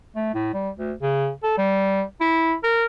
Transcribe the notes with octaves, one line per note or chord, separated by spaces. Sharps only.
A3
A2
G3
D2
C#3
A4
G3
E4
A#4